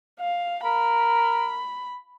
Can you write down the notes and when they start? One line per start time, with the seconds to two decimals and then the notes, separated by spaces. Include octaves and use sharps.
0.20 F5
0.64 A#4 B5